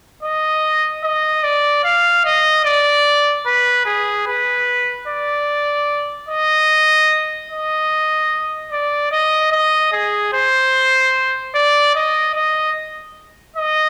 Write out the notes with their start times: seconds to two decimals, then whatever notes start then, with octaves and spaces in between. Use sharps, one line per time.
0.23 D#5
1.04 D#5
1.43 D5
1.84 F5
2.25 D#5
2.65 D5
3.46 B4
3.86 G#4
4.27 B4
5.08 D5
6.29 D#5
7.50 D#5
8.71 D5
9.12 D#5
9.52 D#5
9.92 G#4
10.33 C5
11.54 D5
11.95 D#5
12.35 D#5
13.57 D#5